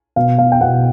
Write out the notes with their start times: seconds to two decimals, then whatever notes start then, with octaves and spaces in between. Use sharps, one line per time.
0.16 B2 F5
0.38 B2 F5
0.52 G5
0.61 B2 F#5